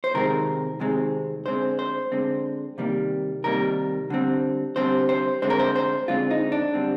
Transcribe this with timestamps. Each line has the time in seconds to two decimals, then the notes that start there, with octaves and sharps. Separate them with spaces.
0.04 C5
0.14 C3 D#3 G#3 C4 A#4
0.80 C3 D#3 G#3 C4
1.46 D3 G#3 C4 C5
1.79 C5
2.12 D3 G#3 C4
2.78 C3 D#3 G3 A#3
3.44 C3 D#3 G3 A#3 A#4
4.10 D3 G3 C4
4.76 D3 G3 C4 C5
5.09 C5
5.42 D3 G#3 C4 C5
5.50 A#4
5.59 C5
5.76 C5
6.08 D3 G#3 C4 F4
6.31 D#4
6.52 D4
6.74 D3 G3 C4